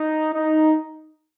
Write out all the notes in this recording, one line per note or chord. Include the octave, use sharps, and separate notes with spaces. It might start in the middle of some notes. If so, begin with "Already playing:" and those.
Already playing: D#4
D#4